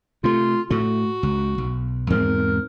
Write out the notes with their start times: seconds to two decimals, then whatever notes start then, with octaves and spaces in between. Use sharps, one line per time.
0.24 C3 A3 F4
0.70 A2 A3 F#4
1.23 C#2
1.58 B1
2.10 E2 G#2 C4 A#4